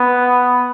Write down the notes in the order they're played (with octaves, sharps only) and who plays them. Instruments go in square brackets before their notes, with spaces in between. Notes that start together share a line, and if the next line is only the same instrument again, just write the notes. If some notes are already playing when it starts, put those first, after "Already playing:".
Already playing: [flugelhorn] B3